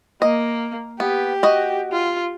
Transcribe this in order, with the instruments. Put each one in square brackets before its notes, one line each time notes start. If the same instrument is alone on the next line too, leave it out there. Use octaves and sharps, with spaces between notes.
[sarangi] A#3 [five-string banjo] D#5
[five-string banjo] B3 [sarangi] G4
[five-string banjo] F#4 D#5
[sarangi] F4